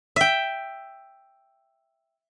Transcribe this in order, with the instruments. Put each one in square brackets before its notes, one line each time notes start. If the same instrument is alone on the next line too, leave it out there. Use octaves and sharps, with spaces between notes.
[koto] E5 G5